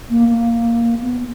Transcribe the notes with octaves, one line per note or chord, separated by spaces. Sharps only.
A#3
A#3
B3